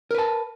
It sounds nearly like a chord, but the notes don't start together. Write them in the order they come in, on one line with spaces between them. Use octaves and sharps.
A#4 B4 A5